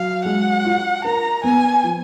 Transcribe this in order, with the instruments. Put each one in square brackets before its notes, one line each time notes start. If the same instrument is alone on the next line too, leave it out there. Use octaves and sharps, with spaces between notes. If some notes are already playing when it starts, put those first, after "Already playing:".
Already playing: [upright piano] F#3 [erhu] F5
[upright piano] G#3 [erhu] F#5
[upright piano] F4
[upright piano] A#4 [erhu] A#5
[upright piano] B3 [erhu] G#5
[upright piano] F3